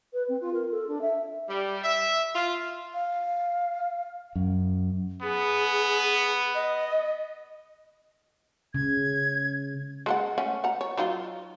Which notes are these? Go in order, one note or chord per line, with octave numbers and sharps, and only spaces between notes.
B4
C4
F4
A#4
A4
D4
E5
G3
E5
F4
F5
F#2
B3 G#4
D#5
C#3 G#6
G#3 A4 F#5
A3 C#4 F#5
F#5 A#5
C#5
F#3 D#4 F4